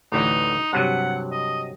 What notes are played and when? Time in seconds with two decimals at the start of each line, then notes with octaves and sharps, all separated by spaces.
0.12 A1 D2 E3 D#4
0.73 G2 C3 F#3 F#5
1.32 D#5